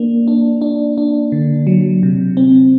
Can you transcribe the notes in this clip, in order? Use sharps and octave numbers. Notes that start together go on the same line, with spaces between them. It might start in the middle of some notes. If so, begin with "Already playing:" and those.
Already playing: A#3 D4
D4
D4
D4
D3
F#3
C3
C4